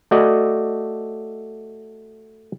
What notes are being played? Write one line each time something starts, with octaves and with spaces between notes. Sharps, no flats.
A3 F#4 D5 D#5